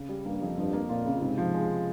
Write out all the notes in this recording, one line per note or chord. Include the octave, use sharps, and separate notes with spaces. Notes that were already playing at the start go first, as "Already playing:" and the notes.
Already playing: C#3
G3
G2 A#3
F2
G2 F3
A#3
A#2 F4
C#3
G#2 C3
F3
G#3